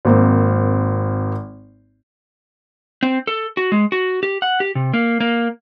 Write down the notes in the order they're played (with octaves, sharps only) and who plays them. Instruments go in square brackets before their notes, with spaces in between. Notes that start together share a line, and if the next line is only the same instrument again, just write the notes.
[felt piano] G#1 A#3 C4
[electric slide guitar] C4
A4
F#4
G#3
F#4
G4
F#5
G4
C3
A#3
A#3